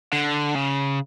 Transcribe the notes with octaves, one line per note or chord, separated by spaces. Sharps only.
D3
C#3